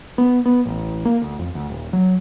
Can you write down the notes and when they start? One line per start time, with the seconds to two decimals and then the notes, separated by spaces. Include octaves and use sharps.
0.18 B3
0.46 B3
0.66 A1
1.05 A#3
1.22 D2
1.39 F2
1.55 D2
1.70 D#1
1.93 F#3